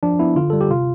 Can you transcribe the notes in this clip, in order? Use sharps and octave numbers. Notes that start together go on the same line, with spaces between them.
F3 D4
B3 E4
D3 F4
G3 A4
G4
C3 F4